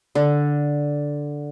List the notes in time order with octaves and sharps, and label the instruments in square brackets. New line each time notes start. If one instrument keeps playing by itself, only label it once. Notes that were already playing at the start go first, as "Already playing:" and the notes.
[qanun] D3